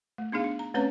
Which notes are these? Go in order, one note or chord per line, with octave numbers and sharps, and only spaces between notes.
A3
B3 D4 D#4 G#4 F5
D4
A#5
A3 C4 C#4 B4 C#5 A#5